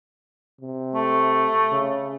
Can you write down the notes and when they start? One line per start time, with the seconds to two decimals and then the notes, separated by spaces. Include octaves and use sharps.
0.61 C3
0.95 A3
1.72 C#3